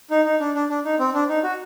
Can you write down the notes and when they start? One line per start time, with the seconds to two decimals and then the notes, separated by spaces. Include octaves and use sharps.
0.10 D#4
0.25 D#4
0.40 D4
0.54 D4
0.69 D4
0.85 D#4
0.99 C4
1.14 D4
1.29 D#4
1.43 F#4